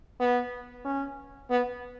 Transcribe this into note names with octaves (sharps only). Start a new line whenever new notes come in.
B3
C#4
B3